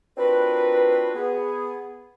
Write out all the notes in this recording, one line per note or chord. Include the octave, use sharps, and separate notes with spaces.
C4 D4 F4 F#4 A#4 B4
B3 G#4